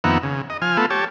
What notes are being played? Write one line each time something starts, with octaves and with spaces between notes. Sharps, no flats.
F2 D#3 A#3 B3 E5 F#5
C#3
D#5
F3 G#5 F6
A3 B3 F4 A4
G4 C#5 A5